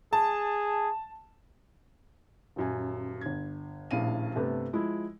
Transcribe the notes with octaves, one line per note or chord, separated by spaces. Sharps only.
G#4 A5
D#1 F#2 G#5
G1 G#6
D#1 A#1 A2 E4 F5 D#7
G2 C3 A3 B3
F3 G#3 E4